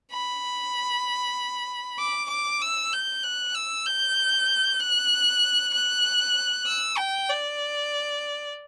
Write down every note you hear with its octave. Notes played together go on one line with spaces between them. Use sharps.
B5
D6
D6
E6
G6
F#6
E6
G6
F#6
F#6
E6
G5
D5